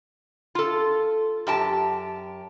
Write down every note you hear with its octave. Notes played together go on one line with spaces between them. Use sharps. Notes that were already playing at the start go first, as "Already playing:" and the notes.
F4 A4
F#2 G4 A5